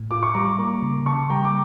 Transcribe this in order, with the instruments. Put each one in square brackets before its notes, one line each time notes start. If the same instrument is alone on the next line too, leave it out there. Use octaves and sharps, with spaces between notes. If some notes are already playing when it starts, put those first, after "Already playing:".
Already playing: [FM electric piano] A2
[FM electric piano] F4 [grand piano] D6
[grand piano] C#6
[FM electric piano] G3 [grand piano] A#5 D6
[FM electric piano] A#3
C#3
[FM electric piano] C#3 [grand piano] A5 C#6
[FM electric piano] G3 [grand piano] G5 A#5
[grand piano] D6